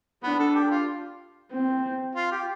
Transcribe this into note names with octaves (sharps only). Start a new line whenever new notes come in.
B3 D4
A4
G4
F4
C4
F4
G4